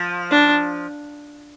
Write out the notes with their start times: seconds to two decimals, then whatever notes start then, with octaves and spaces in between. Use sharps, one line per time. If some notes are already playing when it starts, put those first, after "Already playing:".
Already playing: F3
0.31 D4